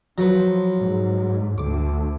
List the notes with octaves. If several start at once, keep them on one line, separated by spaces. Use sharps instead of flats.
F3 F#3 B4
G#2
D2 D6